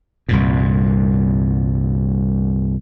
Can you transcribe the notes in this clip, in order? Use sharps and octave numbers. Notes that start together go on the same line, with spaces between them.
C2 G2 A#2